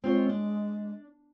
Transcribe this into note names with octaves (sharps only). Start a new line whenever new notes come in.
G#3 C4 F4 C#5
D4